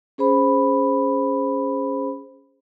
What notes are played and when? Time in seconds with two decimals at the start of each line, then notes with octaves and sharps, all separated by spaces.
0.18 C#4 G#4 C5 B5